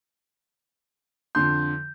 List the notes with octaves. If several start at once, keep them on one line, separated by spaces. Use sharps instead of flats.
F2 D3 C6 G6